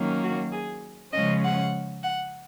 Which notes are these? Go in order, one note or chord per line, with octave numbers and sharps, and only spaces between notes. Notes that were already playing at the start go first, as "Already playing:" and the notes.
Already playing: D#3 F#3 A#3 C#4
F#4
G#4
C#3 F3 G#3 C#4 D#5
F#5
F#5